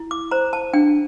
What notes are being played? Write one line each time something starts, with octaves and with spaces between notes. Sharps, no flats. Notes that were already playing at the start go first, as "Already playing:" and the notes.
Already playing: E4
D6
C5 A#5
A5
D4 G5